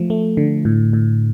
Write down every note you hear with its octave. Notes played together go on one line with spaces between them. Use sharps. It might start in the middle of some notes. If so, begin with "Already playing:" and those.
Already playing: F3 A3
A3
D3
A2
A2